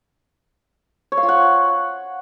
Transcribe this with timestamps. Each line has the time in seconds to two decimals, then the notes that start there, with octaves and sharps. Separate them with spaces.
1.12 C#5
1.17 F5
1.23 F4
1.29 F#5